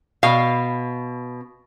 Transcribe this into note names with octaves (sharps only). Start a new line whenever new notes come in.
B2 F5